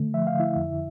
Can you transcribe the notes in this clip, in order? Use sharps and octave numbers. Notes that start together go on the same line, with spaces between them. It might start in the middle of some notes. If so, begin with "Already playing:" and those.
Already playing: D3 A3
F3 E5
F5
D3
E4 E5
F2